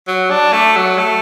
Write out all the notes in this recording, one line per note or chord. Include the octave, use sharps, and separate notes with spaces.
F#3
D4
A3
F#3
A3